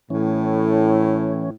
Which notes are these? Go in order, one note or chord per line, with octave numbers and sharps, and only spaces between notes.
A2 E3 C#4